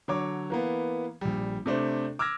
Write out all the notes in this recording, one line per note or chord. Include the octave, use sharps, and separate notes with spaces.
D3 F#3 C#5 D6
E3 A#3 B3
A#1 G3
C3 A3 D4 C5
D6 E6 F6 G#6 A#6